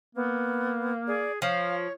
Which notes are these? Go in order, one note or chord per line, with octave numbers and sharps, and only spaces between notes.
A#3 B3
G#4 D5
F3 C#5 F5